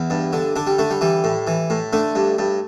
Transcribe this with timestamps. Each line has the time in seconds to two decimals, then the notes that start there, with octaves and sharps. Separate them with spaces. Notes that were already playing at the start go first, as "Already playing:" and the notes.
Already playing: E2 E4
0.10 G2
0.33 D3
0.56 D3 D4
0.67 G3
0.79 D3 A3
0.90 G3
1.01 E3 G3
1.24 A2
1.47 E3
1.70 A2
1.93 D3 A3
2.15 G2
2.38 G2